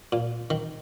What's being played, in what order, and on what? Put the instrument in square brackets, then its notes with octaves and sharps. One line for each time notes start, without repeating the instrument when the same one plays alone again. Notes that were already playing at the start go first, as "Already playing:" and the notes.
[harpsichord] A#2
D#3